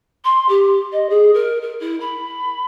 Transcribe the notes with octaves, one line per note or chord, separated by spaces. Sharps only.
C6
G4
D#5
G#4
A#4
A#4
E4
B5